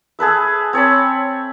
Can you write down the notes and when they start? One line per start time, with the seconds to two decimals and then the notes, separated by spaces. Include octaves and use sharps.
0.19 G#4 A4 B4 E5
0.73 C4 C#5 A5 B5